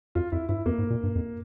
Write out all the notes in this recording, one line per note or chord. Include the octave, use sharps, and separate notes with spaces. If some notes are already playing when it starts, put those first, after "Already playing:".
F2 F4
F2 E4
G2 E4
F2 A#3
G#2
A#2
G2
F2